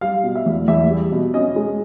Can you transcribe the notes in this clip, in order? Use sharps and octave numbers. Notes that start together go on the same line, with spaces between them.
G3 F5
B2
E5
E2
E2 E5
G3
B2
C#4 D#5
G#3